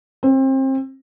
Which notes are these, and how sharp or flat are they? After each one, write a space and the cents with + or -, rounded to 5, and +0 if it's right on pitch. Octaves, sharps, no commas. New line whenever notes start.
C4 +30